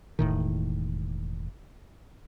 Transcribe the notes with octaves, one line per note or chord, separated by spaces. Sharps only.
E1 A2 D#3